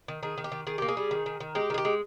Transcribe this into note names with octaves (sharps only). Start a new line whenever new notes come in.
D#3
D#3 G#4
D#3
G4
D#3
D#3 G#4
A#3 G4
G#4
G3
D#3
D#3
D#3
G#3 G4
D#3 G#4
G4
G#3